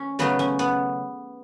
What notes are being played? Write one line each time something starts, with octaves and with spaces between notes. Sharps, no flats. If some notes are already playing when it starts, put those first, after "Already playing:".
Already playing: C#4
C#3 F#3 A3 B3
C#4
B3